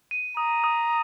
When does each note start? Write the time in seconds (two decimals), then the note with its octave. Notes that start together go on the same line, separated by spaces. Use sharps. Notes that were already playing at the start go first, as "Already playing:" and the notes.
0.11 D#7
0.37 A#5 D#6
0.64 D#6